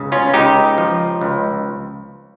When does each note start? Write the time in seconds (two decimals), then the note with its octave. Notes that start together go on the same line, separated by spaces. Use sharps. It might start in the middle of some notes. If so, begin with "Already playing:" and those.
Already playing: C#2 C#3
0.12 C#4 F4
0.34 C#2 D#4 G4
0.78 F3
1.21 C#2